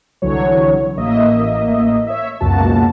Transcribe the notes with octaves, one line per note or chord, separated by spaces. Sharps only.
C2 D3 E3 F#3 C#5
A1 A#3 D#5 E5
C#5 E5
C#2 F#2 B2 A#3 F#4 A5